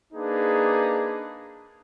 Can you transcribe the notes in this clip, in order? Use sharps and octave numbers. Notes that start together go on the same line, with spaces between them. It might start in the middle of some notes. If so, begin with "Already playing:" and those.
A#3 D4 D#4 G#4 B4